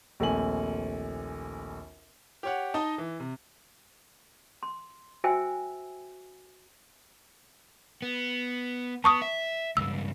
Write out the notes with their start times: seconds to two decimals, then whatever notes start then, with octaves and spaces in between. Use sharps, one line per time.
0.20 A#1 D#2 A3 C4 G#5 F#7
2.43 G4 C#5 F#5
2.74 D#4 D#5 A5
2.98 E3
3.20 C3
4.63 C6
5.24 F#4 C5 E5 G5 G#5 E6
8.02 B3
9.04 B3 A5 C#6 D#6
9.22 E5
9.77 C#2 G2 E6